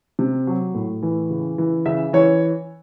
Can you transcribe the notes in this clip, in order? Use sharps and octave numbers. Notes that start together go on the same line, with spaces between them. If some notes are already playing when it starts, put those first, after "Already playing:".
C3
F#3
A2
E3
C#3
E3
C#3 E5
E3 C#5